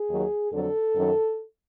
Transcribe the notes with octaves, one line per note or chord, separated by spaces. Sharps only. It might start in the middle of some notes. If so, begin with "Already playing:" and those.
Already playing: G#4
D#2 D#3 F#3
F2 D3 F#3 A4
F#2 D#3 F#3